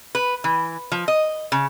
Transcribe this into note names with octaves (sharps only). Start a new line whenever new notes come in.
B4
E3
F3
D#5
C#3